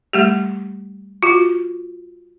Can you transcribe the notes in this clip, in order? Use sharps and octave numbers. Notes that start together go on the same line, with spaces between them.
G3 A3 G4
F4 F#4